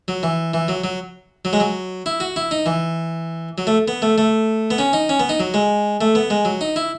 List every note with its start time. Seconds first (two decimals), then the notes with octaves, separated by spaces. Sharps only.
0.08 F#3
0.23 E3
0.54 E3
0.68 F#3
0.84 F#3
1.45 F#3
1.53 G#3
1.60 F#3
2.06 E4
2.20 F#4
2.36 E4
2.51 D#4
2.66 E3
3.58 F#3
3.67 A3
3.88 B3
4.02 A3
4.18 A3
4.71 B3
4.78 C#4
4.93 D#4
5.09 C#4
5.20 B3
5.29 D#4
5.40 F#3
5.54 G#3
6.01 A3
6.15 B3
6.30 G#3
6.45 F#3
6.61 D#4
6.76 E4